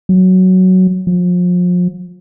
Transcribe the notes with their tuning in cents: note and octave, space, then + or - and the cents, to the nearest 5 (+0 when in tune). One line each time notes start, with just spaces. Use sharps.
F#3 +5
F3 +35